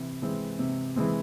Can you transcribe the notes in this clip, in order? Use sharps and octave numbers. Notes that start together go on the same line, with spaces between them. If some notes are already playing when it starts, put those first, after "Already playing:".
Already playing: C3 E3 C4
E3 G#3 C4
C3
E3 G#3 C4